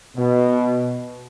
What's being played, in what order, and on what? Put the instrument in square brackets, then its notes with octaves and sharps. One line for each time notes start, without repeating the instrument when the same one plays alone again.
[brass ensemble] B2